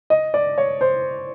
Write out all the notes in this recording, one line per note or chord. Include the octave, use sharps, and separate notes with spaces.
D#5
D5
C#5
C5